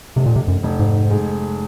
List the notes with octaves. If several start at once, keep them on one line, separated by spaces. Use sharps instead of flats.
F1 C3
A#2
C3
F#2
F1
G#2
G#3